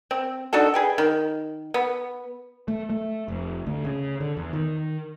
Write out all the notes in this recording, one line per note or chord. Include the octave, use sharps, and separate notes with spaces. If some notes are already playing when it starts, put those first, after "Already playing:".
C4
D4 D#4 F#4 A4
G#4 B4 G5
D#3
B3
A3
A3
F1
D2
C#3
D3
E2
D#3